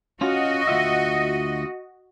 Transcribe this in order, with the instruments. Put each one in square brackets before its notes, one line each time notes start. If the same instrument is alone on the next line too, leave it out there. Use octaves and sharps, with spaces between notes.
[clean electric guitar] C#4 F4 [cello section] F#4 D#5
[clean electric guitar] D2 F4 E5